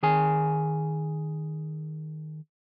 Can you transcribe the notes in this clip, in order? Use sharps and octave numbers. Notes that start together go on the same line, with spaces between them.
D#3 G#4 G#5